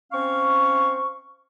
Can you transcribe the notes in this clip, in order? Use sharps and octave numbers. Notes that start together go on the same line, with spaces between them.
C4 C#4 F5 C#6